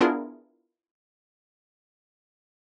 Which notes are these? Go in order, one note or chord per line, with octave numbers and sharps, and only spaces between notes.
B3 D4 E4 F4 G#4 A#4